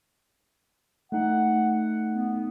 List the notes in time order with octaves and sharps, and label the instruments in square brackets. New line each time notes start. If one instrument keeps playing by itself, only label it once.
[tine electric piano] A3 D#4 [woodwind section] F#5
[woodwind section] B3